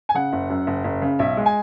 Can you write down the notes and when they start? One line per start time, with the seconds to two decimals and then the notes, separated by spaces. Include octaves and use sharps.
0.09 G#5
0.15 C#3 F#5
0.33 F#1
0.50 F#2
0.67 F#1
0.84 F#1
1.02 C#3
1.19 B1 E5
1.37 G#3
1.46 G#5